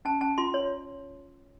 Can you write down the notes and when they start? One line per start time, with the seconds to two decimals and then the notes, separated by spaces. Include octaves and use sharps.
0.05 C#4 A5
0.21 C#4 A5
0.38 F4 C6
0.54 C#5